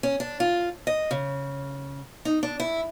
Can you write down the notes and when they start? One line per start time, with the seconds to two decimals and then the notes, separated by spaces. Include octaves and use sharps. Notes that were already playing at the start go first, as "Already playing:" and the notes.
0.03 C#4
0.20 D4
0.40 F4
0.87 D#5
1.11 C#3
2.25 D#4
2.43 D4
2.60 E4